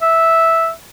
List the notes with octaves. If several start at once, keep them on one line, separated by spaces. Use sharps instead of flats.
E5